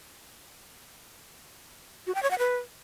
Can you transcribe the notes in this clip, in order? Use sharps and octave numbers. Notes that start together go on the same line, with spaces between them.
F#4
G5
C#5
F#5
B4